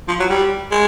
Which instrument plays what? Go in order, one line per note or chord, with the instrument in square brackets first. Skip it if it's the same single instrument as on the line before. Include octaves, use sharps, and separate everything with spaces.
[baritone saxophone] F3
F#3
G3
G#3